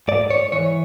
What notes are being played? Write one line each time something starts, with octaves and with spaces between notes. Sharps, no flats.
G#2 D5
C#5
E3 C#5